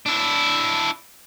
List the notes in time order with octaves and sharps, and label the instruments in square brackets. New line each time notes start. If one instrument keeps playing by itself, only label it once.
[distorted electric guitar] D4 E4